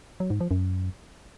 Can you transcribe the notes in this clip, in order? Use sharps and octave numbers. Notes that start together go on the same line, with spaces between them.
F#3
G#2
F3
F#2